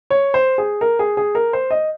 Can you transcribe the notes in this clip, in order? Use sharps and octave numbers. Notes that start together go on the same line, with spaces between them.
C#5
C5
G#4
A#4
G#4
G#4
A#4
C5
D#5